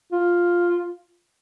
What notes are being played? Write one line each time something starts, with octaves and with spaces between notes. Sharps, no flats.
F4